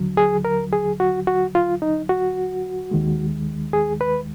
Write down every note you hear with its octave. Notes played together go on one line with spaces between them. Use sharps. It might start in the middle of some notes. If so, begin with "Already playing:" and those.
Already playing: D#2 D3 F#3
G#4
A#4
G#4
F#4
F#4
F4
D#4
F#4
D#2 D#3 G#3
G#4
B4